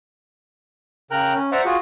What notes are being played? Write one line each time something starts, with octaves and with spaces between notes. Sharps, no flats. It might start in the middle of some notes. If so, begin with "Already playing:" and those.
C#3 A#4 G5 A#5 F#6
C#4
C5 D5 E5 F#5 A#5 D6
F4 F#4 G#4